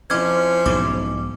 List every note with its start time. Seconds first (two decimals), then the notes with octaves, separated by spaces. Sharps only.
0.10 F2 F3 C#4 E4 C5 D6 F6 G#6
0.66 B1 G#2 B2 D6